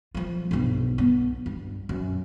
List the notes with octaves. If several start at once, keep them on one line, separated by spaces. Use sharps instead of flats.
F3 F4
B1 G2
B3
G2
F#2